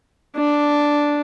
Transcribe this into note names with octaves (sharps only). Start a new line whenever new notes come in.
D4